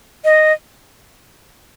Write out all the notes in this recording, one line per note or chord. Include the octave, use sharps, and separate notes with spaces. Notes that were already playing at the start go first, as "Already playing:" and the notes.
D#5